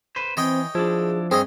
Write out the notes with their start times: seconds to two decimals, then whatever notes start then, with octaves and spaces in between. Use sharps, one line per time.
0.16 B4 C5
0.37 E3 C4 C#5 D#5 G5
0.75 F3 D4 E4 G#4
1.31 G2 C4 G#4 C#5 D#5